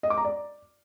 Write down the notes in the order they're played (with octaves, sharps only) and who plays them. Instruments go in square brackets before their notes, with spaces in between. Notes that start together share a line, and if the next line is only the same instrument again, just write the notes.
[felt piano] D#5
D6
A#5
D5